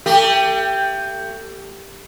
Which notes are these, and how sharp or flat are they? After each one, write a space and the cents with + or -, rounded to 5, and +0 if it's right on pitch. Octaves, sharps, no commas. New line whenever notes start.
A3 +35 G4 +0